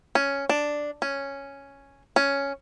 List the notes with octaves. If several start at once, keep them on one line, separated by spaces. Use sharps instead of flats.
C#4
D4
C#4
C#4